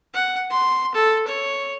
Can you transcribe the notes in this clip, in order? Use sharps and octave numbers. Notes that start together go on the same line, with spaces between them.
F#5
C6
A4
C#5